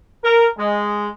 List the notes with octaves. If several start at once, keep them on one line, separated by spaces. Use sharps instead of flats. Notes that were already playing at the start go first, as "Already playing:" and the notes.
A#4
G#3